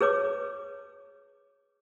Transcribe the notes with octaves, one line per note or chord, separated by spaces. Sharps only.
G#4 B4 C#5 D6